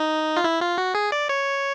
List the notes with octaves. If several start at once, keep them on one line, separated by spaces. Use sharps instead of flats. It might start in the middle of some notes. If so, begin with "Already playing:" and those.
Already playing: D#4
F4
E4
F4
F#4
G#4
D5
C#5